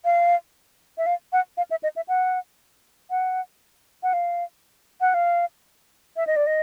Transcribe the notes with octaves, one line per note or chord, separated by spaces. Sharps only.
F5
E5
F5
F#5
F5
E5
D#5
E5
F#5
F#5
F#5
F5
F#5
F5
E5
D#5
D5
D#5